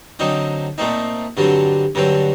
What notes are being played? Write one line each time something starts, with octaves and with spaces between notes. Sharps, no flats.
D3 F#3 C4 D#4
A#2 A3 C4 D#4
G2 D3 F#3 C4
G2 D3 F#3 C4